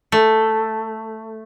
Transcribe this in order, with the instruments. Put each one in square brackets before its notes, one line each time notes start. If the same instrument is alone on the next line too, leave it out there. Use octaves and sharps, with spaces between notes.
[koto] A3